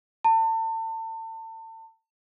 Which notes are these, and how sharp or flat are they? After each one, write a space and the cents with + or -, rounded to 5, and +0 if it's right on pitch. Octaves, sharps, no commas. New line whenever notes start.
A5 +35